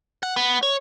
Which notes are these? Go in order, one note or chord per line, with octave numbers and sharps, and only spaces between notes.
F#5
B3
C#5